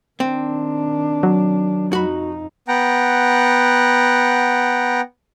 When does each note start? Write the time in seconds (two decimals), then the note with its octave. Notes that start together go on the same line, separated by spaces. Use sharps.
0.20 D#3 C4 D4
1.23 F#3
1.93 F2 D#4 F#4 B5
2.68 B3 F#5 G5 A#5